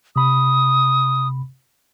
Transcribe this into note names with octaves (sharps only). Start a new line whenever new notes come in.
C3 B5 D#6